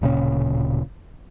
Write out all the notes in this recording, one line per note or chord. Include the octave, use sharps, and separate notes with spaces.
D1 A#2 C#3 C#4